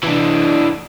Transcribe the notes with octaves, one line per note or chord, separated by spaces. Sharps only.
E3 D4